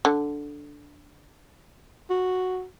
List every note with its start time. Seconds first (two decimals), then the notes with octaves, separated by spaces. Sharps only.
0.05 D3
2.10 F#4